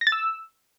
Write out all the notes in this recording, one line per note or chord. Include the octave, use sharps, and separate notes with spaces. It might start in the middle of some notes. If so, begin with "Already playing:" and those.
A#6
A6
E6